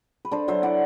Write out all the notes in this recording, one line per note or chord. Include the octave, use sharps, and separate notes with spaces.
B4
D4 A4 C5
F#3 C5 E5
E4 D5 F#5